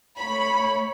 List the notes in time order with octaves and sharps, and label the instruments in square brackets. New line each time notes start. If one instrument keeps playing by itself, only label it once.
[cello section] A3 C#5 [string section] B5